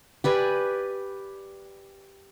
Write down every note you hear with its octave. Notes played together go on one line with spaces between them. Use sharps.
G4 B4 D5 G#5